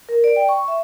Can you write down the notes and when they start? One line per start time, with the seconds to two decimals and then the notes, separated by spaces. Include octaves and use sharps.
0.09 A#4
0.24 D5
0.36 G5
0.49 C#6
0.68 E5